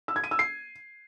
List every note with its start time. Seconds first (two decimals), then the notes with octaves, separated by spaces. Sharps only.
0.08 E6
0.16 G#6
0.24 D#7
0.31 E6
0.39 C7